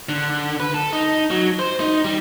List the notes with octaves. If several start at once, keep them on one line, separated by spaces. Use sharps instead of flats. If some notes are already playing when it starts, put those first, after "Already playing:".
D3
B4
A4
D#4
F#3
C5
D#4
G3